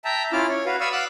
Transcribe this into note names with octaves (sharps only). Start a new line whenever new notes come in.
E5 G5 A5 A#5
C#4 E4 F4 D6 F6
C#5
F#4 B4 F5
D5 F5 B5 C#6 D#6 E6
F5 F#5 D6 E6 F#6